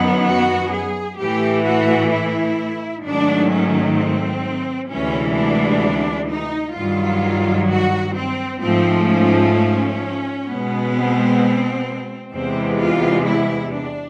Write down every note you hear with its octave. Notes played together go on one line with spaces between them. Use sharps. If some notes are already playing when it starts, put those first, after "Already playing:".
Already playing: F#2 D#3 F#3 B3
F#4
G#4
A2 E3 A3 G4
F#4
E4
G#2 D#3 F#3 A3 D4
C#4
C4
D2 C3 E3 G#3 C#4
D4
D#4
G2 D#3 F#3 F4
F#4
C4
G#2 F3 A3 C4
C#4
C#4
B2 G#3 B3
C4
E2 C3 E3 G#3 B3 C4
F4
E4
D4